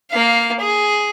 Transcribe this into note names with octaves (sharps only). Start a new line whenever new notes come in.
A#3 F5
G#4